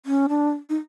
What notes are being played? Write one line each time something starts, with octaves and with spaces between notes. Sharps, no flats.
C#4
D4
D#4